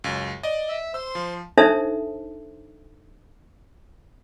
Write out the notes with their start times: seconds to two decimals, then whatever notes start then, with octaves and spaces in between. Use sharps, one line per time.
0.04 C#2 F#2
0.43 D5 D#5
0.69 E5
0.94 C5 C6 E6
1.15 F3
1.57 D4 D#4 A4 C5 E5 A5